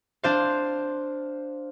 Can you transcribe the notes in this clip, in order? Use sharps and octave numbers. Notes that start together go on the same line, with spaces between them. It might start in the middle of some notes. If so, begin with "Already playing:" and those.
D4 C5 F5